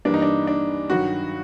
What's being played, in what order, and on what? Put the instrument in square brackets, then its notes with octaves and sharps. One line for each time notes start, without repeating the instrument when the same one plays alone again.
[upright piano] G2 E3 G3 A#3 [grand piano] D4
[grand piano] D#4
D4
D4
[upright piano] G2 D#3 F#3 [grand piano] F#4